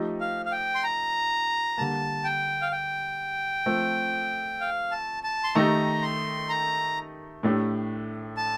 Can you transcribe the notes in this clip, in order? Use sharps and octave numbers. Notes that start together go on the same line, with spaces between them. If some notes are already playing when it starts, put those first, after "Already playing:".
Already playing: F3 A3 D#4 G4
F5
F5
G5
C6
A#5
D3 G3 A#3 A5
G5
F5
G5
F3 A3 C4
F5
A5
A5
C6
D#3 A3 D#4 G4 A#5
C6
A#5
A2 A3 D4 G4
A5